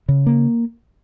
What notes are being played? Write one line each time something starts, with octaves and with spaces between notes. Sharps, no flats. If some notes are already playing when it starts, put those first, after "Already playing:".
C#3
A#3